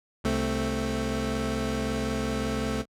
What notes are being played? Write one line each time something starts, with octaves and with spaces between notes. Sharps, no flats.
C2 A3 C4